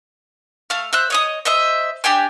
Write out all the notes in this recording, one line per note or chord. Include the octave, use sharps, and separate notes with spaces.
A3 F5
C5 E5 F#6
C#5 D#5 D#6
C5 D#5 E5
D4 G4 G5 G#5